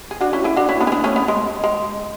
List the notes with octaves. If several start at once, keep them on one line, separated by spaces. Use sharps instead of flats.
G#4
D4 F#4
C#4 E4
E4 G#4
D4 F#4
C#4 E4
B3 D4
C#4
B3 D4
A3 C#4
B3
G#3
G#3